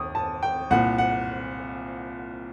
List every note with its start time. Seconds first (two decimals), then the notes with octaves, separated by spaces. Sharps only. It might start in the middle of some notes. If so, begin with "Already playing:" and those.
Already playing: D#2 D#6
0.15 A5
0.43 G5
0.70 C2 A#2 F#5
0.98 F#5